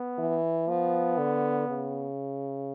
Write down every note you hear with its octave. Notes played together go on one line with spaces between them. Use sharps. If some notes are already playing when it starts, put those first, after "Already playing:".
Already playing: B3
E3
F3 B3
D3
C#3